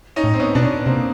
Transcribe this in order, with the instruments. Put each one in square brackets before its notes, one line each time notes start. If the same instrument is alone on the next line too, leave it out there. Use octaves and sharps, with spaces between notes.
[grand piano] C#4 D#4
[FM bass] A2
[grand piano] C4
B3 C#4
[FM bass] B2 [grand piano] D4
[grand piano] B3 C#4
[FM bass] C3 [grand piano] A#3 C4